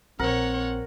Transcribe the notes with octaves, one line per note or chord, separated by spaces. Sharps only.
A#1 C4 A#4 C#5 F#5